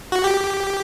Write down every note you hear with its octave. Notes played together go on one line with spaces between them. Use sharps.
F#4
G4